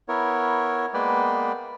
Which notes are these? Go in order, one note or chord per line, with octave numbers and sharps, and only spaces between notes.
B3 E4 A#4 C#5
G#3 A#3 B3 B4 D5 G5